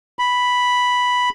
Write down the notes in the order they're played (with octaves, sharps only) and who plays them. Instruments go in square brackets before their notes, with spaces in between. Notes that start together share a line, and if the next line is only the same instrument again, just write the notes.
[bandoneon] B5